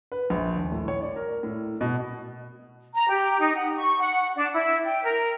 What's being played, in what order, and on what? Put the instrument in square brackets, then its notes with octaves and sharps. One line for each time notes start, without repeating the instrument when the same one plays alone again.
[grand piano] B4
A#1
D#1
A2
C#5
D5
A#4
A2
B2
[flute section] A#5
G4
D#4
F#5
C#6
F#5
D4
E4
G5
A#4